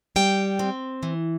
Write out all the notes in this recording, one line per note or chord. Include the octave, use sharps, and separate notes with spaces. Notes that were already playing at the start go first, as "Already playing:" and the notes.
G3 G5
C4
E3